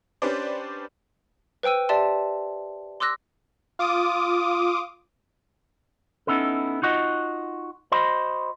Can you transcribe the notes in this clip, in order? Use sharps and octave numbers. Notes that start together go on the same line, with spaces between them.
C#4 D4 G4 B4 C5 D5
B4 C5 G5 E6 D#7
G4 D5 E5 A5 C6
C6 D6 E6 F#6 A#6
F4 D6 D#6
B3 C#4 D#4 E4 A4
D#4 F4 F#4 D#5
F#4 C5 D#5 B5 C6